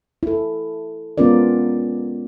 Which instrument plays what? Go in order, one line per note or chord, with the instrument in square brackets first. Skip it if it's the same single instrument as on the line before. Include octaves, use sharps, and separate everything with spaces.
[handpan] E4 A4
G#3 B3 C#4 F4 A#4 D5